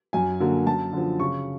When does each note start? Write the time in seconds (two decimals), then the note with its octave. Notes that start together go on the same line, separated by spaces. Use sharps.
0.13 F#2 G#5
0.40 D3 F#3 A#3
0.67 F#2 A5
0.93 D3 F3
1.20 C#3 C#6